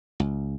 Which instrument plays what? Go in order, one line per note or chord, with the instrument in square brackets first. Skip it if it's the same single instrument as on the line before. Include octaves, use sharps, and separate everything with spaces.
[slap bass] C#2